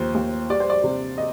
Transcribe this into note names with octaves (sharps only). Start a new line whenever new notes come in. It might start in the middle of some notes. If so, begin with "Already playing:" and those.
Already playing: D#2 F3 C5
D#2
G3 D5
C5
D5
C3
D#5